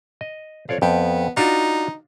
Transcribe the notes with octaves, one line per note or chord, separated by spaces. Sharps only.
D#5
F2 C#5 D5 F5
F2 B3 G5
D4 D#4 F4 F#4